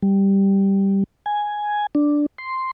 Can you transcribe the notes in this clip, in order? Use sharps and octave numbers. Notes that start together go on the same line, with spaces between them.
G3
G#5
D4
C6